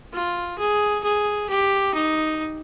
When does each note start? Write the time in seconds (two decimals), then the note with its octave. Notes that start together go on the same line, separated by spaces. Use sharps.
0.13 F4
0.58 G#4
1.03 G#4
1.49 G4
1.94 D#4